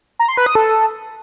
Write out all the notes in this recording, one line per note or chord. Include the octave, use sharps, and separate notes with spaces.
A#5
C6
B4
D#6
A4